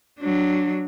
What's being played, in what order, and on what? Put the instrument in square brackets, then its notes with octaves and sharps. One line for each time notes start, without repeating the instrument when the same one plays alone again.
[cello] F#3 D4